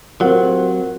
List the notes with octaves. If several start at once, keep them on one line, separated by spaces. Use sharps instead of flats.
A2 F#3 C4 F4 G4 A#4 C5 F#5